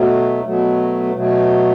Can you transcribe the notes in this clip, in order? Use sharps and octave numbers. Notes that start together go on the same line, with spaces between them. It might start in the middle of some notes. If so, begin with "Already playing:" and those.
Already playing: B2 F#3 A3
B2 F#3 A3
B2 F#3 A3